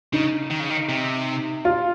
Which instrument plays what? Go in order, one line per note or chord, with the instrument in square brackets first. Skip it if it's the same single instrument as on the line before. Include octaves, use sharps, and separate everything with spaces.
[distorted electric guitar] C#3 [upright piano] D#4
[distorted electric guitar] D#3
C#3
D#3
C3
[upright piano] F4